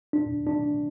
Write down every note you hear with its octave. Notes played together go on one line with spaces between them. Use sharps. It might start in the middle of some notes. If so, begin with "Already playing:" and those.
D4
D4